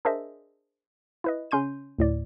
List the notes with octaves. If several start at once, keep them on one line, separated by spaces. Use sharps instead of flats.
D4 G#4 A#4 C5 D#5 E5
E4 B4 D#5
C#3 C#4 C6 G6 D#7
D2 A2 D5